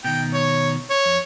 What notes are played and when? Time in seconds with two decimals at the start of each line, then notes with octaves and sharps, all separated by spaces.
0.04 B2 D#3 G5
0.34 C#5
0.90 C#5
1.06 F2